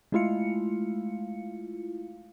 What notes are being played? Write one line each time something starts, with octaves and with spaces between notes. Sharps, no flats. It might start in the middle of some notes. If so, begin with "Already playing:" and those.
G#3 A3 E4 F4 F5 C#7